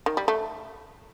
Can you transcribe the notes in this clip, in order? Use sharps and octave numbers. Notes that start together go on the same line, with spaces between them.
D#3
G3
A3